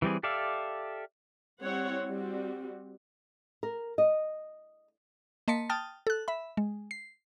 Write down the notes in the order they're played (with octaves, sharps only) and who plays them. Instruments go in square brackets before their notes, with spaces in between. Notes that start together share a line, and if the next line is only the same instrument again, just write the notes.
[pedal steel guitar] E3 G3 C4 G#4
G4 A4 D5 E5 F5
[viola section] G3 C4 E4 C#5 F#5
G3 C4 F#4
[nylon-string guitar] A#4
D#5
[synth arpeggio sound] A#3 D#5 A5 C6 B6 C#7
G5 A5 D#6 F6 A6
A4 F#6
E5 B5
G#3
C7